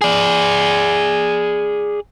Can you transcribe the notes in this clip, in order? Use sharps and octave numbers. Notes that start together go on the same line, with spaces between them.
G#4 D5